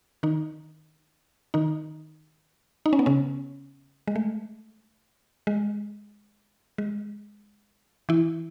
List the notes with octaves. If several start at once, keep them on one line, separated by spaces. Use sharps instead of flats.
D#3 D#4
D#3 D#4
D#4
C#4
B3
C#3 C#4
G#3
A3
G#3
G#3
E3 E4